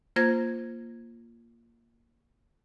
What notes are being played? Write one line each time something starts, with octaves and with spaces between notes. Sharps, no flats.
A#3 F4 C5 G#6 A#6